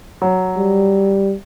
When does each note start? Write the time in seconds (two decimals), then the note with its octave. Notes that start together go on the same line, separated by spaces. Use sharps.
0.22 F#3
0.57 G3